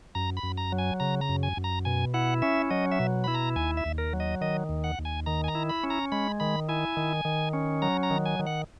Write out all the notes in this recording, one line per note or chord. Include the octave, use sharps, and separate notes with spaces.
F#2 A#5
B5
F#2
A#5
F#3
G#5
C#3 A#5
A#5
F#2
G#5
F#2
A#5
B2 G#5
E4 F#5
C#4 E5
F#3 D#5
E5
B2
E4 B5
A#5
D#2 G#5
E5
D#2
A#4
F#3
D#5
D#3 D#5
D#2
F#5
D#2
G#5
D#3 A#5
G#5
A#5
E4
B5
C#4
A#5
G#3 B5
D#3 B5
E4 G#5
D#3
D#3
C#4
F#3 A#5
A#5
D#3
G#5
D#3
F#5